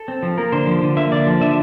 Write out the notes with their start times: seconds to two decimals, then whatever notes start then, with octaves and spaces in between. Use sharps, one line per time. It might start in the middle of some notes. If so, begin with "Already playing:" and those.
Already playing: A4
0.08 C4
0.23 F3
0.38 A#3 A#4
0.52 D3 C5
0.67 F3
0.82 D3
0.97 A#3 E5
1.11 D3 D5
1.27 F3
1.41 D3 E5